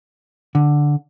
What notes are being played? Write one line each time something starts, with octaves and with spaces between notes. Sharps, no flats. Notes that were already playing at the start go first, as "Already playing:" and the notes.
D3